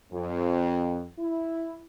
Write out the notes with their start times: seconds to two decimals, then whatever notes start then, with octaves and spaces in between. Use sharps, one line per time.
0.12 F2
1.19 E4